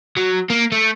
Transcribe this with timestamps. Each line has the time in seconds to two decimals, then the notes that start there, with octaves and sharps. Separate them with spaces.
0.17 F#3
0.50 A#3
0.72 A3